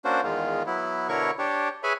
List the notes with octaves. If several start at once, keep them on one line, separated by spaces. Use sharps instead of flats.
A#3 C#4 D4 F#4 C5
E2 D#3 G#3 F4
F#3 B3 E4
B2 D3 E4 A#4 C#5 C#6
D4 G4 C#5
G#4 B4 C#5 E5 G#5 B5